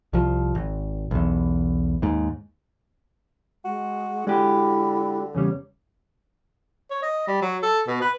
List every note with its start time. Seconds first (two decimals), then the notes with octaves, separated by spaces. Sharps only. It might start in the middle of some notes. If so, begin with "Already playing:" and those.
0.13 C2 F3
0.55 G#1
1.11 B1 E2
2.02 D#2 G#2
3.65 G#3 F#4
4.27 D3 G#3 E4 F#4 G4
5.35 E2 C#3 G3 C#5
6.90 C#5
7.02 D#5
7.27 G3
7.42 F#3
7.63 A4
7.87 B2
8.02 B4